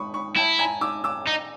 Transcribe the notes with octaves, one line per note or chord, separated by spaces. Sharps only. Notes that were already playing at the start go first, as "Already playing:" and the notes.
Already playing: B5 C#6 D#6
B5 C#6
E4 G5 A5
G#5 A#5
D6 E6
D6 E6
D#4